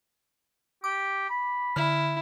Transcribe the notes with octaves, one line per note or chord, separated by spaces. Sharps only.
G4 D6
B5
D3 E4 F6